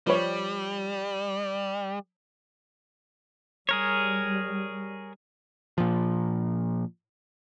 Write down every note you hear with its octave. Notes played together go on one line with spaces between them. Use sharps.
F3 G3 B4 C#5
G3 G#4 A#4 C#5
A#2 F3